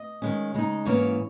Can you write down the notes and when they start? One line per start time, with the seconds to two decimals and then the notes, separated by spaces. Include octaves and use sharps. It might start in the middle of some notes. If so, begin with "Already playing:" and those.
Already playing: D#5
0.22 D#3 G#3 C#4
0.54 C#3 G#3 D#4
0.85 G#2 E3 A#3 C#4 C#5